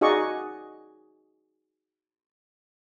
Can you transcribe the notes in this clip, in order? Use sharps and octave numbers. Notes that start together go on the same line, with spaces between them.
D#4 F#4 G#4 D5 D#5 C#6